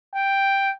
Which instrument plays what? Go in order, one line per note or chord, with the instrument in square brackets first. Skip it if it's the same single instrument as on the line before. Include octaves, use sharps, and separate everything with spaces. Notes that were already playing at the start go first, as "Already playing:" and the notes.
[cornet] G5